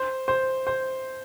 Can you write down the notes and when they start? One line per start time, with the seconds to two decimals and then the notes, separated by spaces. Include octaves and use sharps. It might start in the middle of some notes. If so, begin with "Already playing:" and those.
Already playing: C5
0.28 C5
0.67 C5